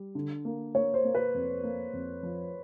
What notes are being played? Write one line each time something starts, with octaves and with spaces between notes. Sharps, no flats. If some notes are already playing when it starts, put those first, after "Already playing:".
Already playing: G3
D3
A#3
A#3 C#5
C5
A#3
B4
F2
A#3
F2
F3